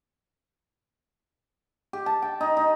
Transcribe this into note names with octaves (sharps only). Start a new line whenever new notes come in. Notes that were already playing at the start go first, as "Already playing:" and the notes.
G4
A5
G5
D#4
D#4